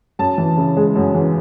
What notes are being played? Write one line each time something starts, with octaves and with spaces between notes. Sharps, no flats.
F#2 A5
E3
C#3
G#3
F#2
E3